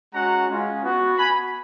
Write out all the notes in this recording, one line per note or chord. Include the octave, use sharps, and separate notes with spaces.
G#3 C#4 F#4 F#5 A#5
G#3 C#4 F4
B3 F#4
B3 F#4 G#5 B5